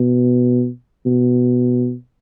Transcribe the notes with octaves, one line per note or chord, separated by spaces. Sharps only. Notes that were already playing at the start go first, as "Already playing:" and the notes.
Already playing: B2
B2